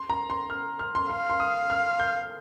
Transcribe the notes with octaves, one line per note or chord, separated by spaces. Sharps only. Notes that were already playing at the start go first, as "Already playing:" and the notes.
Already playing: C6
A#5
C6
F6
F6
C6
F5 C6
C6
D#6
F6
G6